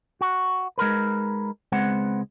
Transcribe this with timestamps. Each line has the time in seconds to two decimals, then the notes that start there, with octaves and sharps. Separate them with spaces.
0.21 F#4
0.78 G#3 D#4 A#4 B4
1.72 C#2 G#3 B3 C4 F#5